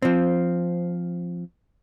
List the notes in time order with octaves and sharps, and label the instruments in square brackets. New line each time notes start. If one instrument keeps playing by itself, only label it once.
[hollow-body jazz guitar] F3 C4